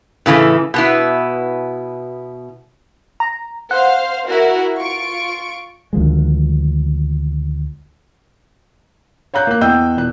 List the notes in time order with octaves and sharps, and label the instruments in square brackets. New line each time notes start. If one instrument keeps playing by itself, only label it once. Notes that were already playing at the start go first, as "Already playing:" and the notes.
[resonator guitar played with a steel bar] A2 C#3 E3 A3
B2 B3 E4
[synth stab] A#5
[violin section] C5 F5 [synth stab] F#5
[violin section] E4 F#4 A#4
F4 C#6 D7
[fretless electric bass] D2 D#3 F3 G#3
[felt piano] C#5 F5 A#5 F#6 G6
A#3 F#6
E2 D#5 G5 E6 G6
E1 F#6